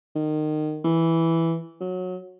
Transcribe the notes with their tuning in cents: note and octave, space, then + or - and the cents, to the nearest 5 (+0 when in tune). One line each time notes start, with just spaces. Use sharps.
D#3 -25
E3 +0
F#3 -20